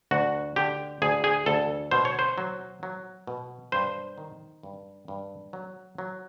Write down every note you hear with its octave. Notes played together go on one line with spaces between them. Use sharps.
D2 F#4
D3 G4
D2 G#4
G#4
D2 A4
B2 C5
C#5
C5
F#3
F#3
B2
G2 C5
D#3
G2
G2
F#3
F#3